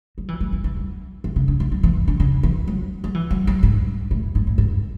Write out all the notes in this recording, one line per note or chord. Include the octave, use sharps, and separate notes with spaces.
F#3
E3
F#3
E3
E3
F#3
E3
C#3
D3
E3
F#3
E3
D3
C#3
E3
F#3
F#3
E3
F#3
F#3
G#2
A2
G#2
A2
G#2